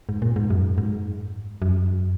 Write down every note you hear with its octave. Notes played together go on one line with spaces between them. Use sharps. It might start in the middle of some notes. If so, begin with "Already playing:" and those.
G#2
A#2
G#2
F#2
G#2
F#2